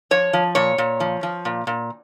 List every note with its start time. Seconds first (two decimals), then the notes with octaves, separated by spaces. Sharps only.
0.11 F3 C#5
0.33 F3
0.55 A#2 C#5
0.78 A#2
1.00 F3
1.23 F3
1.45 A#2
1.67 A#2